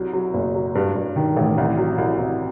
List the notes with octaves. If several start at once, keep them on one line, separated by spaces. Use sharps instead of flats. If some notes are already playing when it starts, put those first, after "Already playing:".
Already playing: C2 F#3
F#3
F#1
F#3
G2
G2
D#3
A1
C2
F#3
C2
C2